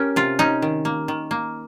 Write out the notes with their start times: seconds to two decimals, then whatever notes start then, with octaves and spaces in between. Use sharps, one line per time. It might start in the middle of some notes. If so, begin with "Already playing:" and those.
Already playing: C#4 G4 A#4
0.16 C3 F4
0.39 C#4 D#4
0.62 D#3
0.85 A#3
1.08 D#3
1.31 A#3